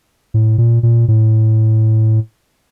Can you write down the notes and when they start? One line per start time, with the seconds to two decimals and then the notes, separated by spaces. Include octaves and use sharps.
0.34 A2
0.58 A#2
0.83 A#2
1.08 A2